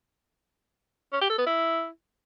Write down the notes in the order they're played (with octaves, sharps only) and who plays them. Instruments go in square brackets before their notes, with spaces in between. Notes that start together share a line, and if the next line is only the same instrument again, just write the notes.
[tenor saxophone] C#4
G4
A4
B3
E4